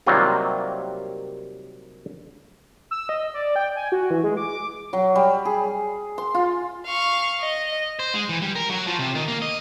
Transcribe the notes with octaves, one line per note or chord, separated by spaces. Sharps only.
C3 D#3 F#3 G3 A#3 F4
E6
D#5
D5
G5
G#5
F#4
E3
G#3
D6
D6
F#3
G3
G#4
C6
F4
F5 C#6
D#5
C5
G#3
E3
G3
A#4
F#3
F3
C3
D#3
A#3
D#5